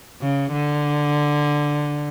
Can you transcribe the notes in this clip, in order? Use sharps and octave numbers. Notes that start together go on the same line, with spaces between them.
C#3
D3